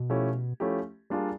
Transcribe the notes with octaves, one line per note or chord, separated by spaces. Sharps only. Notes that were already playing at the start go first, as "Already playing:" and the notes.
Already playing: B2
F3 A3 C#4 E4 G4
F3 A3 C#4 E4 G4
G3 A#3 D4 F4 G#4